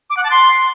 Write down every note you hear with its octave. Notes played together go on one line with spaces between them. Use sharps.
D6
F#5
A5
C6